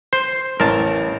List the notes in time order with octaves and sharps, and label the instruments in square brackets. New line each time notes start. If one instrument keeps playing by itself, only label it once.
[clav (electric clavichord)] C5
[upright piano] A1 [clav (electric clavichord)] A#4 A5